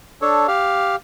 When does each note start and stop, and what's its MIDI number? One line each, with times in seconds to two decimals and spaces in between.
0.22 0.47 62
0.22 0.47 69
0.22 0.47 73
0.48 0.96 67
0.48 0.96 77